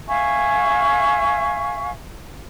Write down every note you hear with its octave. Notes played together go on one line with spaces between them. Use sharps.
E5 F5 G#5 C#6